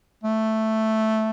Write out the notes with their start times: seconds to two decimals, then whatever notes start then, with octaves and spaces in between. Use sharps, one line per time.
0.23 A3